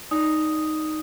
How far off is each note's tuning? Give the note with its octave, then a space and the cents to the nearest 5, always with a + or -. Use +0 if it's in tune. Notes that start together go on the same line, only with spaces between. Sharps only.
D#4 +0 D5 -5 D#6 +0